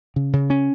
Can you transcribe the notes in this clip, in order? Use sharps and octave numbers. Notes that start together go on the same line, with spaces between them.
C#3
C#3
C#4